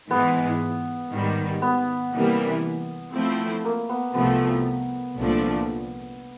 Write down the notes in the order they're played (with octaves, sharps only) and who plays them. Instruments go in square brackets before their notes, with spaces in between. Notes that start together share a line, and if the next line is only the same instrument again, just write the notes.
[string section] G#2 E3 G#3 [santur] B3
[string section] G#2 D#3 G3
[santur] B3
[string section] C3 E3 G3 A#3
F3 A3 C4 E4
[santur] A#3
B3
[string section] C2 C3 F3 A3 [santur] B3
[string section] C2 A#2 F3 A3 D4